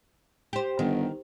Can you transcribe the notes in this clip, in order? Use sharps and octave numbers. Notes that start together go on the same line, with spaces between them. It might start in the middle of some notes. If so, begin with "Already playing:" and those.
G4 C5
G1 D#3